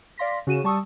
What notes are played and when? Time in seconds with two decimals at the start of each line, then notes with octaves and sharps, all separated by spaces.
0.18 D5 F5 C6 A#6 B6
0.47 C#3 F#4 D#7 E7
0.64 G3 A5 C#6 D#6 E6